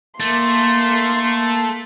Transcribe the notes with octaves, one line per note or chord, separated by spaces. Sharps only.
A3 A#3 C6